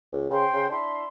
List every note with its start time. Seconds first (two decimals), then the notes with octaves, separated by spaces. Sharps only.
0.12 C#2
0.30 C#3 C5 G5 C6
0.53 C#3
0.69 D4 E4 C6